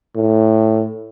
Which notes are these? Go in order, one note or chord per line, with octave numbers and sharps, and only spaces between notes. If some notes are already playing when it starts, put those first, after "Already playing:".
A2